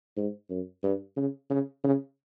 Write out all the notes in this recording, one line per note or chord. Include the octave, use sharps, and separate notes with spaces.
G#2
F#2
G2
C#3
C#3
C#3